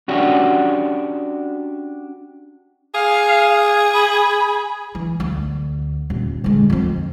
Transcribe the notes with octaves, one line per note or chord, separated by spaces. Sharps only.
C#4 D4 F#4 G4
G#4 F5
B5
E3
D2
D#1
D3 G#3
F2 C4